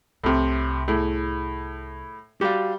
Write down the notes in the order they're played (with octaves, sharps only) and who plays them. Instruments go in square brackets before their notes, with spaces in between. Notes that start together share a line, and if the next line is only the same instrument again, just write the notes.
[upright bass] C2 [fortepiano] A2 C3
[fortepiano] A2 [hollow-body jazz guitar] E4 G#4
[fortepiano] G3 G4 [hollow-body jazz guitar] F#4 F5